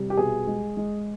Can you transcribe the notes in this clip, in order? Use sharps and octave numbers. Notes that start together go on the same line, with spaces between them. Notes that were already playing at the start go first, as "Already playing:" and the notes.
Already playing: C3 G3
G4
B2 G#4
G#3
G#3